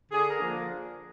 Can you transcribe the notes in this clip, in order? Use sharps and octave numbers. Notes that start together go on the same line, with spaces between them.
D3 G#4
A#4
F3 A#3 D4